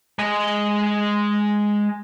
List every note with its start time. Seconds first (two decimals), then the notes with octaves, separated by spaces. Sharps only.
0.19 G#3 D#5